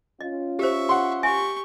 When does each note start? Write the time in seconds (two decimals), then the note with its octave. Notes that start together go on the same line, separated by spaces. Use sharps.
0.21 C#4 F4 D#5
0.59 G4 C5 E5 C#6
0.89 F#5 C6
1.23 G4 E5 G#5 C#6